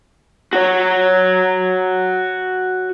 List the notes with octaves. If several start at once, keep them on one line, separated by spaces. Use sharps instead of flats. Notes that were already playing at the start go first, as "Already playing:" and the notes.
F#4 C#5